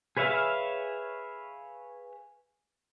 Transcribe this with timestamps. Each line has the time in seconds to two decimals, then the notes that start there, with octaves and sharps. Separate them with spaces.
0.17 G#4 B4 C#5 E5 F5